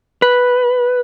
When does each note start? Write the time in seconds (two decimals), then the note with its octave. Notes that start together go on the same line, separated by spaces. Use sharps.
0.22 B4